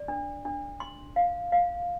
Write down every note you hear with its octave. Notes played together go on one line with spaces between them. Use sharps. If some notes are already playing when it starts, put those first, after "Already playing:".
Already playing: D5
D4
D4
C6
F5
F5